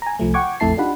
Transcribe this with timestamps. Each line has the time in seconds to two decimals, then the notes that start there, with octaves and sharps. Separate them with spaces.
0.02 G#5 A#5
0.19 C2 F3 A3
0.34 F#5 G5 C#6 D6 G#6
0.60 A#1 F2 A3 E4 A5 C7
0.77 D4 D#4 F4 G4 F#5 B5